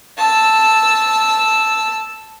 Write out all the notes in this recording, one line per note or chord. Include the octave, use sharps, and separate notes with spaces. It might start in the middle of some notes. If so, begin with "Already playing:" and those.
A5 E6